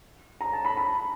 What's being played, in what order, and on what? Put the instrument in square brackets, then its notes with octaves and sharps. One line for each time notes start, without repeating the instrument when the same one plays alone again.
[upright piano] A#5
A5
B5
B5